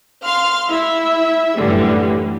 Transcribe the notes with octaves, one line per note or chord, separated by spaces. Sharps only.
F5 C6 F6
E4 E5
F#2 A2 D3 E3 G3